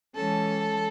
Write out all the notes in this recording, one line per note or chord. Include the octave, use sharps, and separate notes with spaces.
E3 G#3 C#4 A4 A5